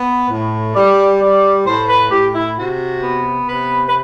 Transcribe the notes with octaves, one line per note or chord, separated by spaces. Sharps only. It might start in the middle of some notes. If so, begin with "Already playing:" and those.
Already playing: B3
A2
G3 D5
G3 D5
A2 C5
B4
A2 G4
E4
C3 F#4
B3
C3 B4
B4